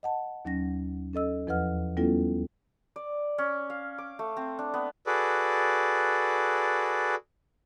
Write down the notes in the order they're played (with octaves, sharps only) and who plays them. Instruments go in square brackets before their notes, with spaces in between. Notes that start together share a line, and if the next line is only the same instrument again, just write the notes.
[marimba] D#5 F#5 A5
D#2 F#3 C#4 A#6
C#4 A4 D#5 E6
E2 F3 B4 D#5 F#5 F6
G3 B3 C#4 E4 F4 A4
[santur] D5
C#4
F5
D6
A3
C4
D4
B3
[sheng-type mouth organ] F#4 G#4 A4 B4 D5